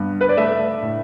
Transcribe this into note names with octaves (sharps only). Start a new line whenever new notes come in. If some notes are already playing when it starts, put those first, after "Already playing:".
Already playing: G2 B3
B4
D5
A3 E5
A2